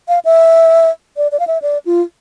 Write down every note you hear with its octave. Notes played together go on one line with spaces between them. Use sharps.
F5
E5
D5
D5
F5
E5
D5
F4